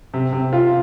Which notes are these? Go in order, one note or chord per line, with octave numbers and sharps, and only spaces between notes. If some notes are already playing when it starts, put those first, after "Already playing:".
C3
C3
F4